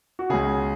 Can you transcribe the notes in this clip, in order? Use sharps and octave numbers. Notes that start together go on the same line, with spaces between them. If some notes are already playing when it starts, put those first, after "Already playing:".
F#4
C#2 C#3 G#4